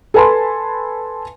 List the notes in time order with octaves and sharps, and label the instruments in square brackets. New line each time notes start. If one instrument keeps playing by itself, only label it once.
[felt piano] A4 B4 G#5 A5 B5 C6